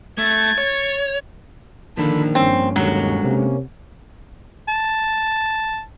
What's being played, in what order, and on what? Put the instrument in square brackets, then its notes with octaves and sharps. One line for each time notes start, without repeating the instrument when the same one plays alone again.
[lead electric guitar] A3 [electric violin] G#6 A6
[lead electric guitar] C#5
[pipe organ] D3 A4 B5 [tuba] D#3 [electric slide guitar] F3 A#3 D4
[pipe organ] G2 C#4 [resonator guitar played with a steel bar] C4
[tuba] D#2 [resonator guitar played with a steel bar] F#3 [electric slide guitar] G#3 D4 A4
[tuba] C3 [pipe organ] A#3 C#4
[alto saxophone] A5